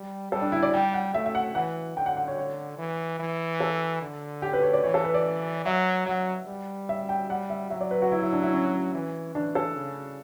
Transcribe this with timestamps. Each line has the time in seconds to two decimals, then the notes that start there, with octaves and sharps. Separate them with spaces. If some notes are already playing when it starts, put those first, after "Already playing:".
Already playing: G3
0.32 G3 A4
0.42 D4
0.52 E4
0.62 D5
0.73 G3 G5
0.94 F#5
1.14 A3 E5
1.26 E5
1.35 F#5
1.55 E3 F#5
1.97 D3 G5
2.06 F#5
2.17 F#5
2.28 C#5
2.38 C#5
2.78 E3
3.19 E3
3.60 A4
4.02 D3
4.42 G4
4.53 B4
4.63 C#5
4.73 D5
4.83 E3 C#5
4.94 A4
5.04 B4
5.14 D5
5.65 F#3 E5
6.06 F#3 F#5
6.47 G3
6.89 E5
7.09 G5
7.30 G3 F#5
7.50 E5
7.70 F#3 E5
7.81 D5
7.91 B4
8.02 F#4
8.12 E4
8.22 E4
8.33 D4
8.43 E4
8.53 C#4
8.94 E3
9.35 E3 D4
9.55 A4
9.76 C#3